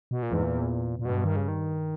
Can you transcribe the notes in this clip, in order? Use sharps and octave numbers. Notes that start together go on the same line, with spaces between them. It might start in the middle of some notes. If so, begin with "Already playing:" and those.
B2
A#2
E2 G#2
A#2
A#2
G2 B2
D#3
C#3
D#3